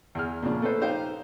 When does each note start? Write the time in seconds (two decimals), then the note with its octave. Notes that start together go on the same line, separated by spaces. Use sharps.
0.15 E2 G#4 F6
0.42 A#2 C#3 F3 D4 G#4
0.62 A3 A4 B4 C5
0.81 D#4 G4 C5 F5 G5